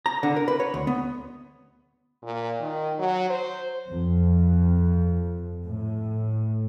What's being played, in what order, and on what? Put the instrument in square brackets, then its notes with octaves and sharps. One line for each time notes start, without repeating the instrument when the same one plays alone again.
[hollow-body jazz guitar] A#5
D3
A#4
B4
C#5
D2
B3
[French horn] A#2
D#3
F#3
C5
[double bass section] F2
A2